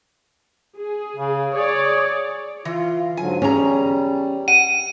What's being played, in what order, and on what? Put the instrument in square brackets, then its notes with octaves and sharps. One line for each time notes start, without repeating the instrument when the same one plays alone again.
[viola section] G#4
[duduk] C#3
[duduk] G#4 [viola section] C#5 D5
[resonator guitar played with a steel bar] E3 [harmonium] F4
[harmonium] G#2 D3 F#3 [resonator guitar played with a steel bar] G#5
[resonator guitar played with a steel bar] E2 A#5 [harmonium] G3 [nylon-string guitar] C#4 G#4
[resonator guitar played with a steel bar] F#5 [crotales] D#7